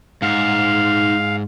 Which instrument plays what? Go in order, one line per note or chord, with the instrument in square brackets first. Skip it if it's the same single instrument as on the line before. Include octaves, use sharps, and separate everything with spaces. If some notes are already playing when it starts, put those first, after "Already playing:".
[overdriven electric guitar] G#2 [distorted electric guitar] D#4 F#5 [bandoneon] F5